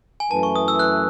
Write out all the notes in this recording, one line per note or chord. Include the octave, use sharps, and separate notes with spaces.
G#5
F#2 E3 A3 E4 B4 A5
C#6
D#6
E6
F#6